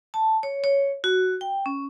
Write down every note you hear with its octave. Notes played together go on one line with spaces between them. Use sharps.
A5
C#5
C#5
F#4
G5
C#4